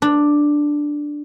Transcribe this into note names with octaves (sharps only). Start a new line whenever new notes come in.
D4